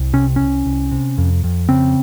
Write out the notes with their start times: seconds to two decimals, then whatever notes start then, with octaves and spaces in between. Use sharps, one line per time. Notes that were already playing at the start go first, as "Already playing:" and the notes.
Already playing: C2
0.13 C3 C#4
0.36 C2 C#4
0.66 C2
0.91 C3
1.18 F2
1.44 F2
1.69 C#3 C4